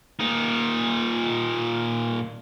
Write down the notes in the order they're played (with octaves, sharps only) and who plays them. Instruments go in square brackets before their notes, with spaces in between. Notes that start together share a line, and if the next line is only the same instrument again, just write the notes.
[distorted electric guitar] A#2 D#4